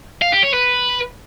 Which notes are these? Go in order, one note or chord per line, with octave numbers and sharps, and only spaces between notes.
F5
G4
C#5
B4